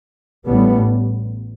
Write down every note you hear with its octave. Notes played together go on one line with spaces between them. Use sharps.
A1 A2 G3 B3